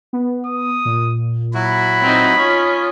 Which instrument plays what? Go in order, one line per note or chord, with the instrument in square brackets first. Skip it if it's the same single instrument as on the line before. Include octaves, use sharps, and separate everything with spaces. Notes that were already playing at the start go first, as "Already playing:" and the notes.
[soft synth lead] B3
[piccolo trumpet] D#6
[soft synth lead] A#2
[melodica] F#3 E4 F#4 [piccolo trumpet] B5
[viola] C4 D#4
[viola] C#4 F4 [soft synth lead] D#6